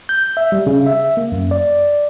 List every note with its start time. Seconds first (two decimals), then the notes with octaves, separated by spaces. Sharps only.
0.09 G6
0.37 E5
0.52 G3
0.67 C#3
0.86 E5
1.17 A#3
1.32 F#2
1.51 D5